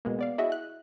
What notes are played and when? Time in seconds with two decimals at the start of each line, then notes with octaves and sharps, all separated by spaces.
0.05 B2 G#3 A#3
0.19 B3 D5 F5
0.38 E4 F#4 G#4 D#5 E5
0.52 F#6